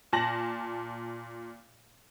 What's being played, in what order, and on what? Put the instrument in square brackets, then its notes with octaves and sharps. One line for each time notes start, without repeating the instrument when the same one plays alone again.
[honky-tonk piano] A#2 A5 A#6 F#7